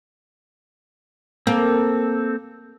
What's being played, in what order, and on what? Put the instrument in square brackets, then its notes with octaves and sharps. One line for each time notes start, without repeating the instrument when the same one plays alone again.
[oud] A#3 [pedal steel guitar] C4 A4